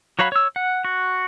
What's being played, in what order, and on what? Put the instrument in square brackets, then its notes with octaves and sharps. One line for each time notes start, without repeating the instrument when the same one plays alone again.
[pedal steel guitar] F#3 F#4 C#5 F5 B5
C#5 E6
F#5
F#4